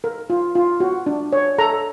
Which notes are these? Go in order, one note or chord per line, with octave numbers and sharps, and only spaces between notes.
A#4
F4
F4
F#4
D4
C#5
A4 A#5